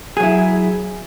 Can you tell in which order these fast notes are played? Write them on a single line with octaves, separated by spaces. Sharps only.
G#4 F#3 E4